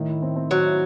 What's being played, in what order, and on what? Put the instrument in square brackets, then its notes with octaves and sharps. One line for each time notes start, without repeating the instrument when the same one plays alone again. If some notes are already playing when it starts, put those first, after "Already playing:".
Already playing: [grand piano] A2 D#3
E4
C4
C4
[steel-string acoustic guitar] F#3 [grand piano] E4
[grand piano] E4